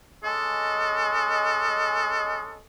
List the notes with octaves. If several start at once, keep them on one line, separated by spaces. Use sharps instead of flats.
G#3 C#4 A4 D#5